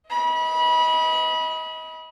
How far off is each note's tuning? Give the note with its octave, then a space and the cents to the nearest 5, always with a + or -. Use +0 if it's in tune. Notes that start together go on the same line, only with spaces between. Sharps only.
D#5 +30 B5 -25